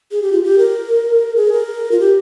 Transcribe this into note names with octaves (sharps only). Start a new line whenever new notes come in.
G#4
G4
F4
G4
A#4
G#4
A#4
F4
G4